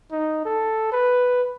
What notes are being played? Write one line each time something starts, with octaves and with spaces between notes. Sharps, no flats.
D#4
A4
B4